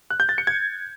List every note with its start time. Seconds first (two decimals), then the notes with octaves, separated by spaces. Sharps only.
0.10 F#6
0.20 G6
0.29 A6
0.38 C#7
0.47 G#6